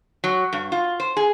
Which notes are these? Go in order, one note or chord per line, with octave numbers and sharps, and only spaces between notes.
F#3
G2
F4
C5
G#4